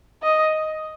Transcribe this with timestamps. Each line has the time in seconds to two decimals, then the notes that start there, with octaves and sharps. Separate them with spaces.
0.23 D#5